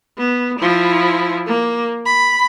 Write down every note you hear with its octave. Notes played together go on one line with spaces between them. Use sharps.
B3
F3 E4
A#3
B5